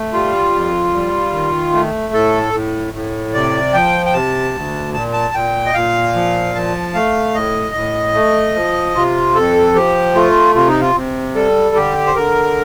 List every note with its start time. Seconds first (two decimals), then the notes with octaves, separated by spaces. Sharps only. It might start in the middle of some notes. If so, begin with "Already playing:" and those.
Already playing: A3
0.13 G3 F4
0.53 F2
0.94 G3
1.33 D#3
1.73 A3
2.13 A2 A4
2.53 A2
2.94 A2
3.34 C3 D5
3.73 F3 G5
4.06 G5
4.14 C3 A5
4.53 D2
4.94 A#2 A5
5.13 A5
5.34 A#2 G5
5.66 D#5
5.74 A#2 F5
6.15 F3
6.55 F3 A5
6.94 A3 F5
7.34 A2 D#5
7.75 A2
8.14 A3
8.55 F3
8.95 C3 F4
9.35 F2 A4
9.75 F3 G4
10.15 A3 F4
10.55 C3 F4
10.68 D#4
10.81 F4
10.95 C3
11.35 G3 A4
11.76 D3 G4
12.07 C5
12.16 D3 A#4